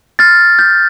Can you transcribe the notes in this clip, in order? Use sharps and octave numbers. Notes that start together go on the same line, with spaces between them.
F6 A6
G6